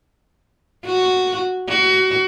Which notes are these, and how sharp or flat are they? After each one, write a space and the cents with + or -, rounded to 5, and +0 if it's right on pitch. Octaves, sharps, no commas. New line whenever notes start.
F#4 +0
F#4 +25